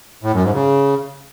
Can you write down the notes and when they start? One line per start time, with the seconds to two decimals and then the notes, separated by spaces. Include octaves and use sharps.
0.23 A2
0.33 F#2
0.43 G#2
0.54 C#3